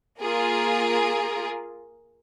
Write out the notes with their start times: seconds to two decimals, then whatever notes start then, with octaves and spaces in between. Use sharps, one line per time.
0.22 A#3 F4 G#4 A#4